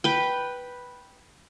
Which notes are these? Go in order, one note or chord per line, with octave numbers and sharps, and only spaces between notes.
B4 G5